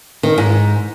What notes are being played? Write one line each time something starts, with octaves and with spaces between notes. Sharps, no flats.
D#3
G#2